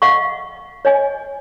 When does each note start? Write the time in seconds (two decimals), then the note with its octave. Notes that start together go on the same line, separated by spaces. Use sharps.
0.02 D#5 F5 F#5 C#6
0.85 C#5 D#5 G#5